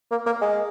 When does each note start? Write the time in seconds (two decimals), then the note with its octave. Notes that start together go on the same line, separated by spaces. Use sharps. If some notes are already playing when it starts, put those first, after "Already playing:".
0.11 A#3
0.26 A#3
0.41 G#3